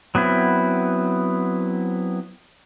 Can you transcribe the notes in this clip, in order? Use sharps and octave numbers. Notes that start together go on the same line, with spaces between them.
F#3 B3 C4 E4